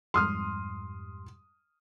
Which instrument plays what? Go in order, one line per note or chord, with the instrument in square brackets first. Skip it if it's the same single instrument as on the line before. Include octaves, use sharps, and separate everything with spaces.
[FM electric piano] F2 G#2 G3 [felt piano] C6 D#6 F6